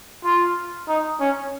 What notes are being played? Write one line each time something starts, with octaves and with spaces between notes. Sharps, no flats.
F4
D#4
C#4